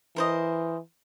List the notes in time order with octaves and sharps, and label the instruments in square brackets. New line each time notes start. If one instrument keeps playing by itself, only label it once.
[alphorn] E3 [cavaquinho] A#4 C5 D#5